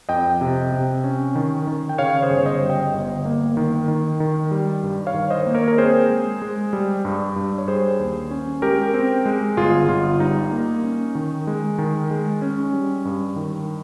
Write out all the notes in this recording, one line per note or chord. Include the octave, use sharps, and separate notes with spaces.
F2 D#5 G5
C3
C3
C#4
D#3
D#3
G5
C#3 C#5 F5
G#4 C5
G1
C#5
C5 D#5
G3
D#5 G5
G1
A#3
D#3
D#3
D#3
G3
G2
C#5 F5
D#3
C5 D#5
A#3
A#4 C#5
A#4
C4 G#4 C5
G#3
G#3
G3
G2
G2
C#5
G3 G#4 C5
D#2
C#4
G#3 G4 A#4
C4
G#3
G1 F4 G#4
G1 F4
G3 D#4
A#3
C#4
D#3
G#3
D#3
G#3
C#4
G3
G2
D#3